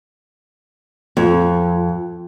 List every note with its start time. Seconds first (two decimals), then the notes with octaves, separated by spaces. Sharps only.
1.17 F2